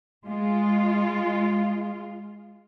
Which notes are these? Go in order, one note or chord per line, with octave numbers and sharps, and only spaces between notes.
G#3 F4